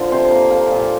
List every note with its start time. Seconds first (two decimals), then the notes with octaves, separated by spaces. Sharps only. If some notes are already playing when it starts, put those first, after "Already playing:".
Already playing: D3 F3
0.12 C3 C5
0.31 A#3
0.51 A#3
0.71 A#2